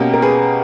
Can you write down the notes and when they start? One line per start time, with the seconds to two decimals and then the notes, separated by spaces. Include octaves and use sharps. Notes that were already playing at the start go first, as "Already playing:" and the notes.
Already playing: B2 A#3 C#4 G4 A#4
0.14 A#4
0.22 G#4 B4